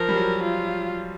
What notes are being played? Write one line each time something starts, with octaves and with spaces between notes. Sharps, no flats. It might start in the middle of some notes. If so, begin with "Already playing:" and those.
Already playing: F3 A#4
G3
F#3
F4